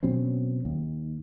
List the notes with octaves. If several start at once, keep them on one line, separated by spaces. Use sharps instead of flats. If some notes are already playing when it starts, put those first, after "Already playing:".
B2 F#3 C4 C#4
D#2